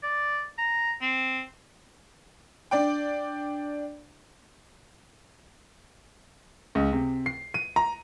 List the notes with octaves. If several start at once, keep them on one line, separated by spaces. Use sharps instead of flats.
D5
A#5
C4
D4 D5 G5
C#2
C3
C7
D#7
A#5